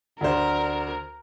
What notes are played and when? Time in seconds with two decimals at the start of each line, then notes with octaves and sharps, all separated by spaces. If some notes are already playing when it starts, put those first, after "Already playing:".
0.21 D2 D4 A#4 C5